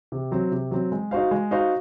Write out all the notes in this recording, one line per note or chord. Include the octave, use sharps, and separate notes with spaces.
C3
F#3 C4
C3
F#3 C4
G#3
D#4 F#4 C5 F5
G#3
D#4 F#4 C5 F5